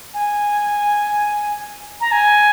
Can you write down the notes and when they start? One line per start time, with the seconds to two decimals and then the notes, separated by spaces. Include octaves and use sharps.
0.14 G#5
2.01 A#5
2.12 G#5